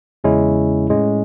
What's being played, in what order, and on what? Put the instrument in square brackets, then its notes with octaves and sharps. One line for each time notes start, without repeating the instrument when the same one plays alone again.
[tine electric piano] E2 C#3 G#3 C#4 E4
A2 G#3 C#4